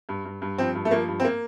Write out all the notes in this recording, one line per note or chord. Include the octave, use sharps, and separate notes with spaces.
G2
G2
G2
F3 C4
G2
A3
F3 A#3
G2
C4
A#3